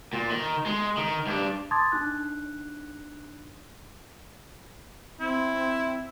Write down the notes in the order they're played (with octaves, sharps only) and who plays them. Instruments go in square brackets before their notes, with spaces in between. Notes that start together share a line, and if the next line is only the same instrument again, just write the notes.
[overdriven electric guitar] A#2
D#3
G#3
D#3
G2 D4
[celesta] A5 C6 D6 D#6 G#6 A6
D4 D#4 F#6
[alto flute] C4 [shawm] E4